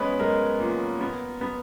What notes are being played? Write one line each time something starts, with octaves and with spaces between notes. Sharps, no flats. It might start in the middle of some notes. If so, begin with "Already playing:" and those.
Already playing: G#3 B3 C#4 B4 C#5
G#3 A#4
A#2
B3
B3